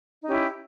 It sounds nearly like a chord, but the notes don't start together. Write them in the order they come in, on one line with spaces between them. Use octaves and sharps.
D#4 C#4 G4 E4